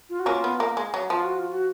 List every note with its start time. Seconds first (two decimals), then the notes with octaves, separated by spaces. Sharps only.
0.10 F4
0.20 F#4
0.26 A#3 C#4 F4
0.44 B3
0.60 A#3
0.77 G#3
0.94 F#3
1.10 F3 F4
1.24 F#4
1.38 F4
1.51 F#4